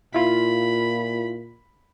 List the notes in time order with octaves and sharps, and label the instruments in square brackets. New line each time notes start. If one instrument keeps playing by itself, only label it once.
[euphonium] A#2 [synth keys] E4 F4 [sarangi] B5